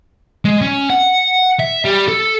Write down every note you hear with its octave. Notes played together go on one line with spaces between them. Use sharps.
G#3
C#4
F#5
E5
G3
A4